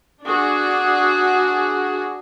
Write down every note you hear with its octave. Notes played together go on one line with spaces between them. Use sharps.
D4 F#4 G#4